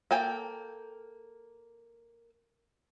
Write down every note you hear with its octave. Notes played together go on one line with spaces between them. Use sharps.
A#3 A4 G5 G#5